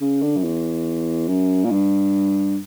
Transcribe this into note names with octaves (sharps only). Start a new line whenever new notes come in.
C#3
D3
F#2
E2
F#2
A#2
G2